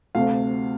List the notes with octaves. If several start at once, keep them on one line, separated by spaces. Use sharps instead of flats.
D2 C3 A3 F5